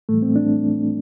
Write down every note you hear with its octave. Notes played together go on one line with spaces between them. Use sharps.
A2 E3 G3 A3
C4
D4